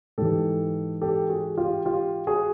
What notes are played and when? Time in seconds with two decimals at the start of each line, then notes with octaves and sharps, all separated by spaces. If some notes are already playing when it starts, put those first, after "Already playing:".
0.18 G#2 E3 G4 A4
1.02 G4 A4
1.29 F#4 G#4
1.57 F4 G4
1.85 F4 G4
2.27 F#4 G#4